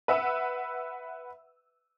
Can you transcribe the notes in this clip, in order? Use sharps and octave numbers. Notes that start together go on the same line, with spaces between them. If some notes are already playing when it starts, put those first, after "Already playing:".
B4 E5 F#5 E6